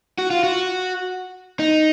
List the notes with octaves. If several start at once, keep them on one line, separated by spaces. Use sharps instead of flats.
F#4
F4
F#4
D#4